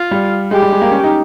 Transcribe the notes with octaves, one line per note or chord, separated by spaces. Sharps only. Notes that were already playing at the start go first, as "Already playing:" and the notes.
Already playing: F4
G3
G#3 G4
G3
G#3
A#3
C#4
D#4